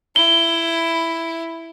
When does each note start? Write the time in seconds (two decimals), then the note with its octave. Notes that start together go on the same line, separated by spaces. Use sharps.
0.16 E4 G7